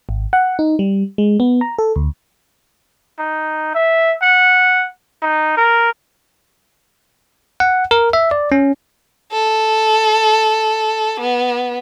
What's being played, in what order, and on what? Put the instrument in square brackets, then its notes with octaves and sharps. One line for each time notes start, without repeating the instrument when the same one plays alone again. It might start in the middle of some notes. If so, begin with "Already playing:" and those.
[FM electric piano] G#1
F#5
D#4
G3
G#3
B3
A#5
A4
D2
[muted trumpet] D#4
E5
F#5
D#4
A#4
[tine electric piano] F#5
A#4
E5
D5
C#4
[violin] A4
B3